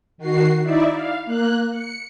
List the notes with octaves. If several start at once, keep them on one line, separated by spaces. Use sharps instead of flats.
D#3 F#4 C7
D#4 E4 D5 E5
F5
A#3 F#6
C#7